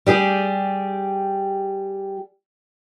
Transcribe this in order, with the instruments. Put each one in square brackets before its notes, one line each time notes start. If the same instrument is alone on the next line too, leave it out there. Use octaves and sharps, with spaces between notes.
[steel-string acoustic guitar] G3 G4 G#4